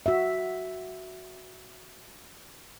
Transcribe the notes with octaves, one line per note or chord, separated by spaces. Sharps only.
F#4 E5